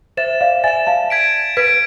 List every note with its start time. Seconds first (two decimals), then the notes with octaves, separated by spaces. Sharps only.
0.17 C5 E5 A6 E7
0.41 D5 F5
0.64 E5 G#5 A6 E7
0.87 F5 A5
1.10 G#6 B6 D7
1.57 B4 G#6 B6 D7